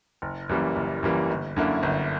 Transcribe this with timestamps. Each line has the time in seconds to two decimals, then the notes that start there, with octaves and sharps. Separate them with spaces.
0.22 F#1
0.49 F#2 E3 G3 A#3
0.76 F#1
1.03 F#2 E3 G3 A#3
1.30 G1
1.56 F#2 D3 A#3 E4
1.83 G1